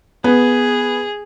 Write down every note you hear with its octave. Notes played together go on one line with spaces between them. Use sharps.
B3 G#4